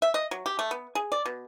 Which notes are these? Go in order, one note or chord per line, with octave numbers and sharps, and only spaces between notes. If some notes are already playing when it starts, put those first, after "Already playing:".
E5
D#5
F#3
G4
A3
B3
G#4
D5
B2